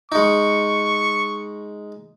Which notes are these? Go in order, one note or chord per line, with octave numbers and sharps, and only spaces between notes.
G#3 D#4 C#6